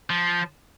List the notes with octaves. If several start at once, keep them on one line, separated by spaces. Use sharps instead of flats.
F3